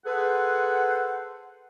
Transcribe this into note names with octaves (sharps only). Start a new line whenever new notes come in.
G#4 A4 B4 C5 F#5